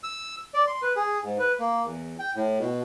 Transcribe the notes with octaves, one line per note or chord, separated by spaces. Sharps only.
E6
D5
C6
B4
G#4
G#2
B4
A#3
E2
G5
A2
B2